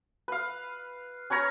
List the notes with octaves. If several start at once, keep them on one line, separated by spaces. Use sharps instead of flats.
B4 F5
C#4 B4 C#5 A#5